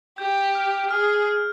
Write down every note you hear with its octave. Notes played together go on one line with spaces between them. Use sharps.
G4 G6
F6
G#4 F6
F6